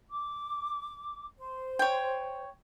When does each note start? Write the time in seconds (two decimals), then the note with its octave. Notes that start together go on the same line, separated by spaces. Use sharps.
0.11 D6
1.38 C5
1.79 C#5 G5